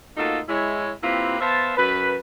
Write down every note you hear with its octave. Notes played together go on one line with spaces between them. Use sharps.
A3 A#3 D#4 F4 F#4 A4
G#3 E4 C#5
A#3 C4 E4 F4 G4 B4
B3 C5 E5 F5 A5
F#2 B4